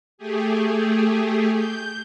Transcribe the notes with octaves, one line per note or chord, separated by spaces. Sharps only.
A3 G4 G#4
G6